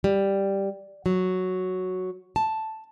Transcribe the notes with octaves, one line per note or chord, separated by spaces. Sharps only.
G3
F#3
A5